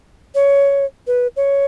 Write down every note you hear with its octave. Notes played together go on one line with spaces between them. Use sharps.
C#5
B4
C#5